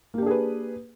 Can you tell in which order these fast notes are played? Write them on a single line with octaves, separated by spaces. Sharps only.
A#3 G4 D4 G#4 B4